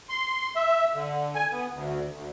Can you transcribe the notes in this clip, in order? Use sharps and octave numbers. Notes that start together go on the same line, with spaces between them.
C6
E5
D3
G#5
B3
D2
D2